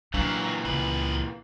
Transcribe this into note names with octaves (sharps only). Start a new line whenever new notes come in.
A#2 E3 F#3 D4 F4
C#2 F3 B4